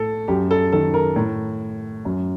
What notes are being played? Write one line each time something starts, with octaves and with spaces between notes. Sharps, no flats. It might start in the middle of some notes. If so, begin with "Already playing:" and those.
Already playing: A2 A4
F#2 G4
A4
D#3 A4
A#4
A2
F#2